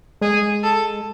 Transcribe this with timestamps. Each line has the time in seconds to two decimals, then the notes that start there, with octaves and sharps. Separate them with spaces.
0.21 G#3 G#4
0.63 A4